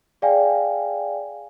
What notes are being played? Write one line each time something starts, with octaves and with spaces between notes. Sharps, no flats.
G#4 D5 F5 G5 G#5